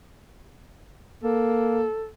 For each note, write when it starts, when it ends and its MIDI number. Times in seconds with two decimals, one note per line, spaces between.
1.24 1.86 58
1.24 2.09 69